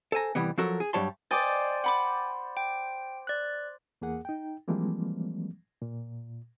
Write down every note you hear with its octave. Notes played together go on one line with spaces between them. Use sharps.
A4 C5 G#5 A#5
C2 E3 G3 B3
F3 F#3 F#4 A4 A#4
G#4
G2 F#3 G3 C#5 A5 C6
C5 D5 D#5 G5 G#5 A6
F#5 B5 D6
G5
D5 F#6
E2 A#3 G#4 F#5
D#4 G5
E3 F3 G3 G#3 A#3 C4
A#2